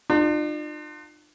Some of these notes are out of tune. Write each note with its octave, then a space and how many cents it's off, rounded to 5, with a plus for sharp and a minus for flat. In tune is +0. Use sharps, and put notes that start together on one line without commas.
D4 +45 F4 +0